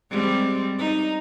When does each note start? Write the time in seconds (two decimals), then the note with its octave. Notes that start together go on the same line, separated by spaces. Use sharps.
0.10 G3 G#3 C4
0.79 D#4